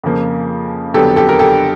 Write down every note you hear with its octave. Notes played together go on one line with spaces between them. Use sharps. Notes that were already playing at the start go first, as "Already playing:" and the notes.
F2 C#3 F3 A#3
F2 D3 F#3 B3 G4 A4
G4 A4
A#4
G4 A4